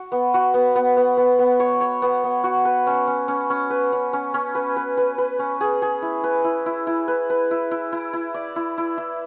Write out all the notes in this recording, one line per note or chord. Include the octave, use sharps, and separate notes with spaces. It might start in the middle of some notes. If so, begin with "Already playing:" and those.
Already playing: F#4
B3
F#4
B3
B3
B3
B3
B3
C#5
C#5
B3
B3
F#4
B4
C#4
C#4
C#4
C#4
B4
C#4
C#4
C#4
B4
B4
B4
B4
C#4
G#4
G#4
E4
B4
E4
E4
E4
B4
B4
E4
E4
E4
E4
D5
E4
E4
E4